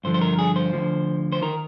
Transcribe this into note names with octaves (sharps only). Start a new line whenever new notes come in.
G2 D3 F3 C5
C5
A#4
G#4
C5
D2 D3 F3
C5
D#3 A#4